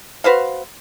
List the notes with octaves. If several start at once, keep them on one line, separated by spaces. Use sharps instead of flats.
F#4 B4 C5 F5